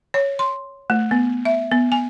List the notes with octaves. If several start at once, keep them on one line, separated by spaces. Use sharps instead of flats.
C#5
C6
A3
B3
E5
B3
G#5